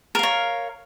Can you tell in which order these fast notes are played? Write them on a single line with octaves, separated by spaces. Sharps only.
A#4 F5 C#5